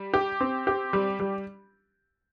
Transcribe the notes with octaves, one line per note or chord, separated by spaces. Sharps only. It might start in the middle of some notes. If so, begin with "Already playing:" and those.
Already playing: G3
G4
C4
G4
G3
G3